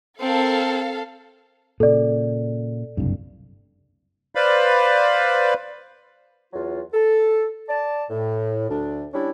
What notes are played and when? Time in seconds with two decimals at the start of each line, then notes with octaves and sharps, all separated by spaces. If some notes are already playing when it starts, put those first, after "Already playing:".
0.20 C4 A4 A#4 F5
1.80 A#2 C#3 A4 D5
2.97 F#1 C2 G2
4.35 B4 C5 D5 F5 B5
6.53 E2 F#3 F4
6.94 A4
7.69 D5 A5
8.10 A2
8.69 D2 D4
9.13 G3 C#4 D4 E4